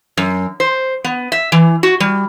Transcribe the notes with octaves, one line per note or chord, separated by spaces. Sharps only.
F#2
C5
B3
E5
E3
F#4
G3